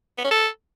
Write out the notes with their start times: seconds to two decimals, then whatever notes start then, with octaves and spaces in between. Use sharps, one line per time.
0.18 B3
0.24 C#4
0.31 A4